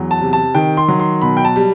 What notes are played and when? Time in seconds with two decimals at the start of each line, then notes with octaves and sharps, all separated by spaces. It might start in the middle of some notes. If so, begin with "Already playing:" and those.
Already playing: E2 F#3
0.11 A5
0.21 C3
0.33 A5
0.55 D#3 G5
0.77 C6
0.88 F#3
1.00 C6
1.22 B2 B5
1.37 G5
1.45 A5
1.56 G3